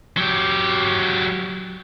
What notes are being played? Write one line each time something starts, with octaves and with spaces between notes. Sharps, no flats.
F#3 G4